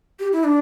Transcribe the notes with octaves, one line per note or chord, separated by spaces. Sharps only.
G4
E4
D4